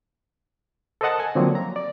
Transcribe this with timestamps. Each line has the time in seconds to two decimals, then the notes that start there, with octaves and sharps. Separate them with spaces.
1.01 A4 A#4 C5 D#5 F#5 A5
1.20 G#5
1.35 D3 F3 F#3 A#3 C4 D4
1.55 A#5
1.76 D5